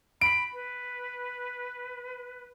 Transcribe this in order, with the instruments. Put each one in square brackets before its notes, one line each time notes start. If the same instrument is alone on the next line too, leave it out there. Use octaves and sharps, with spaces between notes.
[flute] B5 [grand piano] D7
[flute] B4